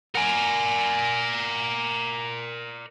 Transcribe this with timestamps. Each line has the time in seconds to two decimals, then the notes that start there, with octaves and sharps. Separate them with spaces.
0.15 A#4 D5 F#5 G#5